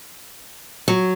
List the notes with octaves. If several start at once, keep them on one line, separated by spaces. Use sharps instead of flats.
F#3